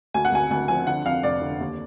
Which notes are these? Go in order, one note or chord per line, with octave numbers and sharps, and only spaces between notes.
D2 G#5
F#5
D2 G#5
D2 G#5
F3 G#5
D3 F#5
F2 F5
F1 D5
D3
D#2